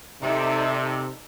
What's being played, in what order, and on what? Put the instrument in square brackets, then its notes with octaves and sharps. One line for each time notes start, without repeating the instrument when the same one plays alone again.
[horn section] C3 [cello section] D#4 A4 D5 [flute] E5